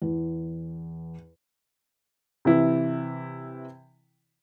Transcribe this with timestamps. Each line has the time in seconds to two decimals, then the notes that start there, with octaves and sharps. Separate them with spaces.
0.02 E2
2.45 C3 E3 E4